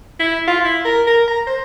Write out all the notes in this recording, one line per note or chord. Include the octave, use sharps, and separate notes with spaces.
E4
F4
E4
A#4
A#4
A#5
C5